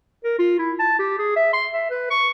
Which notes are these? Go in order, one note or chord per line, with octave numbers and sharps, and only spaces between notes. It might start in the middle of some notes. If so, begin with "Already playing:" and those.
A#4
F4
E4
A5
G4
G#4
E5
C6
E5
B4
C#6